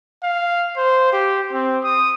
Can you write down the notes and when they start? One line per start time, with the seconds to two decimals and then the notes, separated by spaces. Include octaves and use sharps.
0.23 F5
0.77 C5
1.13 G4
1.53 C4
1.84 D#6